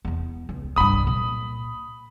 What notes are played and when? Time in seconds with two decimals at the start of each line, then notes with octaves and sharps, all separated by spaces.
0.05 E2 B3
0.49 C#2
0.76 C2 G2 B5 D#6
1.07 A#2